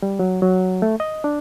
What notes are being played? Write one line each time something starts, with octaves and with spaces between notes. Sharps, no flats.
G3
F#3
F#3
A3
D#5
D4